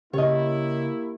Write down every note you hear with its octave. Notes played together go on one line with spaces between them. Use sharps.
C#3 A#3 E4 G4 C#5 D#5